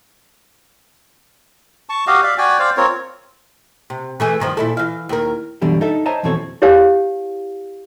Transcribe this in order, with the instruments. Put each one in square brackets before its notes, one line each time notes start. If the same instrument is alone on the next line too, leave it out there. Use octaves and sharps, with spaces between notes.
[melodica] A5 C#6
F#4 G4 D#5 F5
D5 E5 F5
F#4 D5 G5 G#5
C5 D5 F5 G5
C4 F4 A#4 C#5
[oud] C3
E3 A3 G#4
G2 D#3 F3
A#2 E4 A4
E3 F5
D#2 A#4
[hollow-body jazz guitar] F#2 B2 D3 E3 G3 D4
D#4 A4 E5
C5 C#5 D#5 E5 A5 A#5
F2 B2 E3 C4 A4 C#5
[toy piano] E4 G4 C#5 F5 G#5